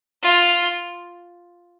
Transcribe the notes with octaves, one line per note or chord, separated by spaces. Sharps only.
F4